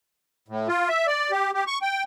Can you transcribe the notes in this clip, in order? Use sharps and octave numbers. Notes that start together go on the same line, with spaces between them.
A2
F4
E5
D5
G4
G4
C#6
G5